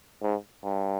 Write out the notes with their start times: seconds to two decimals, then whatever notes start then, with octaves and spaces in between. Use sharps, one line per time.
0.23 G#2
0.64 G2